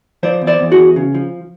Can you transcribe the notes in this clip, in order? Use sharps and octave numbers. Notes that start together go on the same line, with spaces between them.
F3 C5 D5
E2
C5 D5
E2
F#4 G#4
E2
C#3
F3